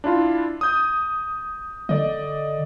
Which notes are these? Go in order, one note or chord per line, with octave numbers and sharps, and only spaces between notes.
D4 E4 F4
D#6 G6
D3 D5 D#5